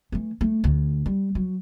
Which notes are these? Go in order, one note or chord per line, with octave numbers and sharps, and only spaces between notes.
E3 A3
A3
D2
G3
F#3